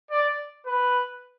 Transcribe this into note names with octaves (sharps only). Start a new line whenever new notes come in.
D5
B4